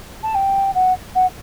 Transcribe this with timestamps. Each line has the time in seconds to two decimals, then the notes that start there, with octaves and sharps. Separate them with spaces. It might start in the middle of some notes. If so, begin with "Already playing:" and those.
0.23 A5
0.35 G5
0.75 F#5
1.15 F#5